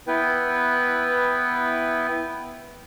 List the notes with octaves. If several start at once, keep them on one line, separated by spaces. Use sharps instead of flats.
B3 E4 B4 G5